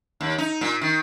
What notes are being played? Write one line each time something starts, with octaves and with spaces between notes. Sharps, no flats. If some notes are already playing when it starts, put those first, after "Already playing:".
D#2
D#4
A#2
D#3